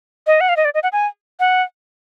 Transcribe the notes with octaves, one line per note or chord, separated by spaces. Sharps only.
D#5
F#5
F5
D#5
D5
D#5
F#5
G#5
F#5